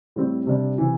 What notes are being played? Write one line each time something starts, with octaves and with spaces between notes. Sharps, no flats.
A2 G3 C4
C3 G3 D4
C3 E3